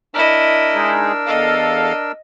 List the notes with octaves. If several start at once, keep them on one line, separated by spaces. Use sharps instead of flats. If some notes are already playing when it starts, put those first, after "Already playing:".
D4 E4 A#4 D#5 E6
G#3 D#4 G#4
E2 A4 D#5 F5